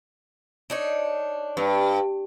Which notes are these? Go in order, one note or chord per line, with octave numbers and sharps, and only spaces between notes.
D4 D#4 C#5
G2